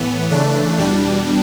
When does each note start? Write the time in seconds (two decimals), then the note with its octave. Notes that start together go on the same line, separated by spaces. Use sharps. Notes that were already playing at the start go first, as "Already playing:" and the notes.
Already playing: A2 E3 B3
0.30 C#3 E3 A3 D4
0.78 E2 B2 G3 D4